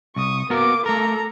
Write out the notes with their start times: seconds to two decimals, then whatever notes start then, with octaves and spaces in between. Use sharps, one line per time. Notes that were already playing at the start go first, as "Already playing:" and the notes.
0.16 C2 C#6 D#6
0.50 A#3 B3 F#4 A#4 D6
0.86 A3 A4 A#4 A#5